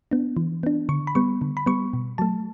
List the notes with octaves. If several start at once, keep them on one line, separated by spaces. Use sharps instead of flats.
B3 D4
E3
B3 D4
D3 C#6
B5
G3 B3 C#6
D3
B5
G3 B3 C#6
B2
F#3 A3 A5